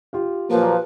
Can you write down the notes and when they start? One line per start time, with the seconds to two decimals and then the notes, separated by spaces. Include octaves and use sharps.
0.13 F4 G4 F5
0.51 A#2 F3 F#3 A#3 B4